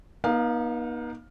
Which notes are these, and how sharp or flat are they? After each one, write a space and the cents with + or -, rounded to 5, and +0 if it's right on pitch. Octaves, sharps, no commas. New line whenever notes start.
B3 -45 D#4 +0 F5 +10